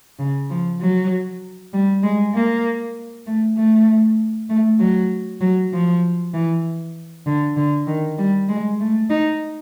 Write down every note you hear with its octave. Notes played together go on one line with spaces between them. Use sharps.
C#3
F3
F#3
G3
G#3
A#3
A3
A3
A3
F#3
F#3
F3
E3
D3
D3
D#3
G3
G#3
A3
D#4